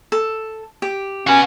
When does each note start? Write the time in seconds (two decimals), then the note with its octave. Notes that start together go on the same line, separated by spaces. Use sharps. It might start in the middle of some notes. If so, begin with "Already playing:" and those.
0.12 A4
0.82 G4
1.27 C#4 F#4 B4